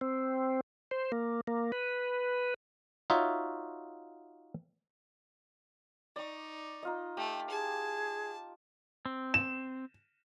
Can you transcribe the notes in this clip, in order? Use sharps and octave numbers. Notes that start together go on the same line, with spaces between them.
C4
C5
A#3
A#3
B4
D#4 F4 F#4 C#5 E5
D#4 D5 C#6
D#4 F4 D#5
A3 G4
G#4 A5
C4
E7